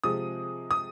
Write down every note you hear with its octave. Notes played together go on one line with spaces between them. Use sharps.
C3 F3 G#3 D#6
D#6